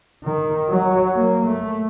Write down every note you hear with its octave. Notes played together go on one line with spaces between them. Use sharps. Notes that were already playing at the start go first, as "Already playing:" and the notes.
D#3
F#3
A#3
A3